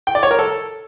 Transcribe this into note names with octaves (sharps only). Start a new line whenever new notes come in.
G5
D5
C#5
A#4
A4